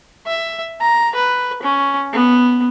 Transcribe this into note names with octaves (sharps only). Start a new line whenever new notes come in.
E5
A#5
B4
C#4
B3